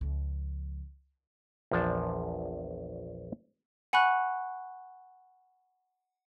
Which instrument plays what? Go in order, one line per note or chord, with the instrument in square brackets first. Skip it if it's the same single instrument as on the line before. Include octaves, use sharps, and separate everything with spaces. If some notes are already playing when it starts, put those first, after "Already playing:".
[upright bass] C#2 F3
[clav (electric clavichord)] A#1 E2 F3 D4 A5
[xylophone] F#5 G#5 B5 C#6 F#6